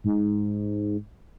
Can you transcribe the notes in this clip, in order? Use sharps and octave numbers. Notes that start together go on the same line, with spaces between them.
G#2